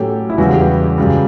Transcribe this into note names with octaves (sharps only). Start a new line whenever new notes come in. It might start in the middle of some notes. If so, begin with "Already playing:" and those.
Already playing: A2 F#3 C#4 G4 A4
E4
E2 C#3 E3 G3 F#4
G4
F#2 C#3 G3